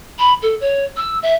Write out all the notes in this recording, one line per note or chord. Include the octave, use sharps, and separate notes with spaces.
B5
A4
C#5
E6
E5